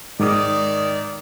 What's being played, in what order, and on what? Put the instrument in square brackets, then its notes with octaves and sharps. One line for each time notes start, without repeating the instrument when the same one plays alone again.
[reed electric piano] G#2 D6 D#6 [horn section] D#3 D5